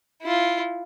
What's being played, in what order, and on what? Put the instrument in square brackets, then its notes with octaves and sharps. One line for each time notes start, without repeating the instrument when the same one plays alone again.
[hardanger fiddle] E4 F4